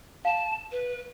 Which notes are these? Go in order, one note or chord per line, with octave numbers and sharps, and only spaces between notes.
F5 A5
B4